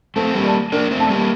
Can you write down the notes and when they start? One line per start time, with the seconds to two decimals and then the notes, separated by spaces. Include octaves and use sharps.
0.16 A3 C4 A4
0.35 G3 A#3
0.44 D5 A5
0.72 A#3 D4 A#4
0.91 A3 C4
1.00 D5 A5
1.09 G3 A#3